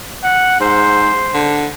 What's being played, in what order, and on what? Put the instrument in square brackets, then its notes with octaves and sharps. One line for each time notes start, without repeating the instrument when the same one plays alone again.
[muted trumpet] F#5
[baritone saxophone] G#2 [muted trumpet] C5
[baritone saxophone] D3